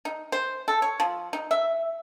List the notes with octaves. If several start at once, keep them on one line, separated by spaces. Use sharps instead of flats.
D#4
C5
A4
C#5
F3
D#4
E5